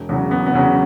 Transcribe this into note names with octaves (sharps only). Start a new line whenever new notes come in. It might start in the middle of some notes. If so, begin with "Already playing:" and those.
Already playing: E1
E2 C#3 F#3
E1 B3
B3
E2 C#3 F#3